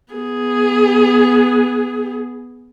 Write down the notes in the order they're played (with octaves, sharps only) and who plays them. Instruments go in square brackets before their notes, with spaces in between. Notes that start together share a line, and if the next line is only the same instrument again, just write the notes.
[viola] B3 G#4